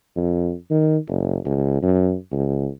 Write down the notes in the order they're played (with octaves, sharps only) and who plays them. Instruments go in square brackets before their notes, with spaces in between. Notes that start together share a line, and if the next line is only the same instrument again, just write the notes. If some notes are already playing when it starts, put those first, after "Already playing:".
[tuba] F2
D#3
F#1
C#2
F#2
C#2